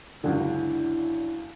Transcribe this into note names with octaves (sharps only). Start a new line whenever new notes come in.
C#2 F#2 D3 D4 E4